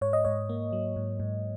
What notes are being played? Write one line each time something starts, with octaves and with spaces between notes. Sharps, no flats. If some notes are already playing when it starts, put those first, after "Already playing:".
G#2 C#5
D#5
G#2 C#5
A#3
F#3
G#2
G#2